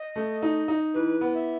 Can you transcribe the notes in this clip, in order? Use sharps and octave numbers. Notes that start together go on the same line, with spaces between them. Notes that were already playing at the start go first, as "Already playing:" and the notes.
Already playing: D#5
A3
D#4
D#4
E3 B4
B3
E5